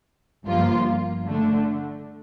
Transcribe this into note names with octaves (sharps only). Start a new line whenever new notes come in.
G1 G2 F3 A#3 F4
D3 A3 D4